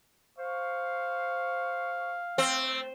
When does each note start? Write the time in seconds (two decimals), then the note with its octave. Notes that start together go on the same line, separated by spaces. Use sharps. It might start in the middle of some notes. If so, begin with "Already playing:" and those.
0.39 C5 F5 C#6
2.38 A3 C4